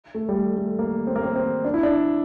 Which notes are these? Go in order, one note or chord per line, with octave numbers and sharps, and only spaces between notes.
A3
G3
A3
A3
A#3
C4
A#3
C4
C4
D4
E4
D4